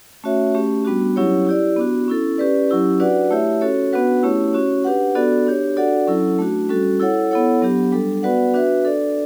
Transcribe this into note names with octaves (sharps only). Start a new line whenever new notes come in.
A3 C#4 F#4 C#5 E5
A3 C#4 G4
G3 B3 D4 F#4
F#3 C#4 E4 G4 C#5
E4 G4 D5
B3 D4 F#4
C#4 E4 A4
C#4 G4 B4 D5
F#3 C#4 E4 G4
D4 F#4 B4 D5 F#5
A3 E4 G4 C#5 E5
C#4 F#4 A4 C#5
B3 D4 F#4 B4 F#5
A3 C#4 E4 G4 C#5
C#4 F#4 C#5
D4 G4 B4 F#5
B3 D4 F#4 A4 D5
D4 G4 C#5
D4 F#4 A4 D5 F#5
F#3 C#4 E4 A4
A3 D4 F#4
G3 C#4 F#4 A4
E4 A4 C#5 F#5
B3 E4 A4 C#5 F#5
F#3 B3 D4 G4
G3 D4 A4
B3 F#4 B4 D5 F#5
D4 F#4 B4 E5
D4 A4 D5